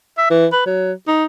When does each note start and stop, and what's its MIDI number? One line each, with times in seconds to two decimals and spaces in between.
0.18 0.26 76
0.30 0.47 52
0.52 0.64 71
0.66 0.93 54
1.08 1.25 63